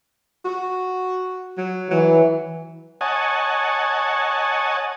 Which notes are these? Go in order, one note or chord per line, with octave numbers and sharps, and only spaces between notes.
F#4
F#3
E3 F#3
C#5 D#5 F#5 G#5 A5